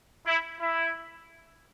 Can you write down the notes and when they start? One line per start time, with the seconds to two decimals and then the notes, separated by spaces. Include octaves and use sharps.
0.26 E4
0.60 E4